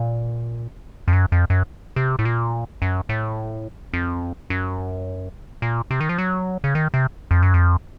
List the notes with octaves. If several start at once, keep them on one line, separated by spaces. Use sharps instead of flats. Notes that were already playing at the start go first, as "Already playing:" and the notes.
Already playing: A#2
F2
F#2
F2
F#2
C3
A2
A#2
F#2
A2
F2
F#2
A#2
C3
D#3
F3
F#3
C#3
D#3
C3
F2
F#2
F2